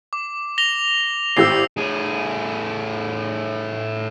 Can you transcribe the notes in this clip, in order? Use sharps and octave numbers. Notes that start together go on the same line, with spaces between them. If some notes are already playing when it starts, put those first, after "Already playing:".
D6
A#6 F7 G7
G#1 A2 G4 E6 C7
A2 G#4